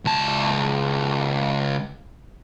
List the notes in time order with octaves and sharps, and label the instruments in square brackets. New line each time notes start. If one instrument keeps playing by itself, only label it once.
[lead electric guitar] C#2 A5